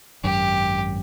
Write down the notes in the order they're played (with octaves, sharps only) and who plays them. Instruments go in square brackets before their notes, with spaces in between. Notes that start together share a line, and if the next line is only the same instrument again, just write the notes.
[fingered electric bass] G#1 F#2 [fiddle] G4